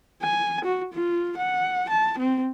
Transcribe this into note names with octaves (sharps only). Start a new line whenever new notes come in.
G#5
F#4
F4
F#5
A5
C4